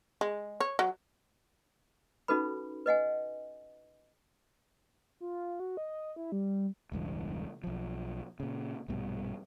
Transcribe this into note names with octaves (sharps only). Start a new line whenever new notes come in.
G#3
C#5
F#3
C#4 D#4 F#4 A4 B4 B5
B4 D#5 F#5 G#5
F4
F#4
D#5
E4
G3
E1 C#2 G2 E3
B1 F3
A#2 C#3
A#1 G2 B2 G3